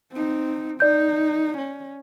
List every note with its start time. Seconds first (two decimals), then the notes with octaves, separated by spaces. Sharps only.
0.13 C4 D#4
0.80 D#4 D5 G6
1.57 C#4